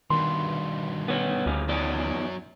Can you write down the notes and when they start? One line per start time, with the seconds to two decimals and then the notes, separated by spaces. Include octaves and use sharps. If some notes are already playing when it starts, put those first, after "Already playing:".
0.10 G2 B2 D#3 C6
1.08 B3 C#5
1.46 D2 G2 C#3 C#4
1.69 E2 D#3 F#3 C#4 D5